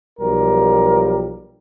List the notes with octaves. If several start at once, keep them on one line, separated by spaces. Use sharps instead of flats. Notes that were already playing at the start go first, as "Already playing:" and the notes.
B1 F3 G3 A#4